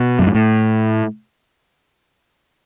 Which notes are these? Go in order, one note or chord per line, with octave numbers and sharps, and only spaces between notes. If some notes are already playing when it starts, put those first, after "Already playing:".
Already playing: B2
F#2
G#2
A2